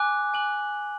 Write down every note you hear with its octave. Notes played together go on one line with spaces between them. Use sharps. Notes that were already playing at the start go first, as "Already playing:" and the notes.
Already playing: G#5 D6 F#6
G#5 D6 F#6 F#7